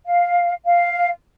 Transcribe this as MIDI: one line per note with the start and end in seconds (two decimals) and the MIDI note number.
0.05 0.52 77
0.65 1.09 77